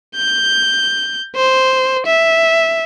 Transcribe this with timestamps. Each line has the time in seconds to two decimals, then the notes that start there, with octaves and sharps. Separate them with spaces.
0.16 G6
1.36 C5
2.06 E5